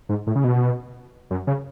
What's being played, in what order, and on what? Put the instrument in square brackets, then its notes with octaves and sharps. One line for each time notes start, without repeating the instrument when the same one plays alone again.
[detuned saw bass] G#2
A2
C#3
B2
F#2
C#3